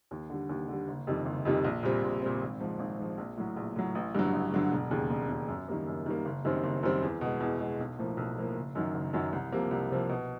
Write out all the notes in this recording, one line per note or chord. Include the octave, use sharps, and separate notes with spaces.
D#2
D3 G3
D#2
D3 G3
F#1
F2 C3 D#3 G3
F#1
F2 C3 D#3 G3
A#1
A#2 G3 C4
A#1
A#2 G3 C4
G#1
G#2 F3
G#1
G#2 F3
A#1
A2 F#3
A#1
A2 F#3
A1
G2 D3 F#3
A1
G2 D3 F#3
E1
D#2 C#3
E1
D#2 C#3
F#2
D#3 G3 A#3
F#2
D#3 G3 A#3
F#1
F#2 D#3 G3 C4
F#1
F#2 D#3 G3 C4
E2
B2 G#3
E2
B2 G#3
B1
A2 F3 A#3
B1
A2 F3 A#3
F#1
F#2 D#3 F#3
F#1
F#2 D#3 F#3
C2
C3 F3 A#3
C2
C3 F3 A#3
B2